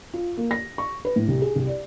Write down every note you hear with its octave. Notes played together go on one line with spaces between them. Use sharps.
F4
A#3
A#6
C#6
B4
A2
C2
G#4
C2
D5